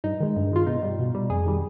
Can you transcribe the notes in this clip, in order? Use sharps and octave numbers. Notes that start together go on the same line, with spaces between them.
G2 D#4
D#3 G#3
G2
D#3 G#3 F4
B2 D#4
G3
B2
G3
F2 G#4
D#3 G3